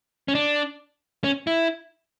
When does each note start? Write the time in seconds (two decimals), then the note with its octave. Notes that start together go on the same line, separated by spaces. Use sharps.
0.28 C#4
0.35 D4
1.24 C#4
1.47 E4